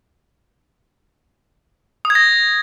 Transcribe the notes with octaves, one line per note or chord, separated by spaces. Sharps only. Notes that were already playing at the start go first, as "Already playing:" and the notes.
D#6
G#6
A#6